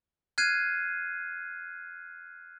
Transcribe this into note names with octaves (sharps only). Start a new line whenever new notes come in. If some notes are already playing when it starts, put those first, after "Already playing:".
F6 F#6 G#6 C7 D#7